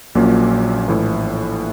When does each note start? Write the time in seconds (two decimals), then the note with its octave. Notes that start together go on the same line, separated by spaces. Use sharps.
0.15 A#1 A#2 F#3 A#3 C#4
0.88 A#1 A2 E3